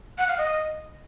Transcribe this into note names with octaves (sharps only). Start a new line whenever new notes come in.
F#5
F5
D#5